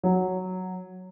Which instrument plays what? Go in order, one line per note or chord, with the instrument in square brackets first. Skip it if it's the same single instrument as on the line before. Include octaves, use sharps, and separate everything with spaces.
[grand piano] F#3